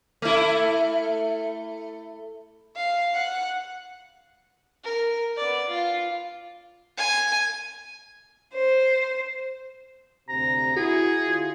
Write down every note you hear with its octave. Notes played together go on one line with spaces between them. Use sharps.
A3 E4
F5
F#5
A#4
B3 D5
F4
G#5
C5
D2 C3 A#5
E4 F#4 G#4
D3 E4 F4